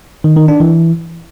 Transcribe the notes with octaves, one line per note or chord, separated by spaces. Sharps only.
D#3
D#3
D4
E3